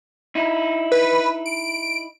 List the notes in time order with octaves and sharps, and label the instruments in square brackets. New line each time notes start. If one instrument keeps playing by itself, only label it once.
[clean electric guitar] D#4 E4
[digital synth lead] B4
D7